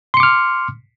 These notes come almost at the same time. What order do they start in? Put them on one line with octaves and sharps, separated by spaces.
C6 C#7 D6 F6